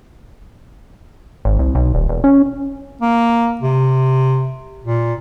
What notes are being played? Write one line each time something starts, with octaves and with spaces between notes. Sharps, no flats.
G#1
C2
B1
D#1
E1
C#4
A#3
C3
A#2